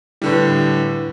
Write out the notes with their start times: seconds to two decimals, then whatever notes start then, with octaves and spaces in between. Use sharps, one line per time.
0.22 A2 D3 G3 E4 B4